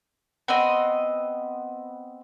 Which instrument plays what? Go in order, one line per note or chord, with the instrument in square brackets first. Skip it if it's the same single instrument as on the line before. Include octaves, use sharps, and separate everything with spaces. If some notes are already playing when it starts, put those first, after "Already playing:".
[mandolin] B3 C4 D#5